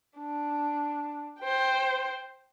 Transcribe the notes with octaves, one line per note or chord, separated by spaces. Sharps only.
D4
C5 G5